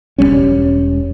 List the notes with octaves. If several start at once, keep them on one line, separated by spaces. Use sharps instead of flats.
E1 F#2 G3 C#4